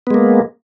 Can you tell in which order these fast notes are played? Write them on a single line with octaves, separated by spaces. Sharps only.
B3 G#3 A#3